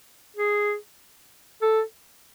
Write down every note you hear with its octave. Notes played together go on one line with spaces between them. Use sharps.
G#4
A4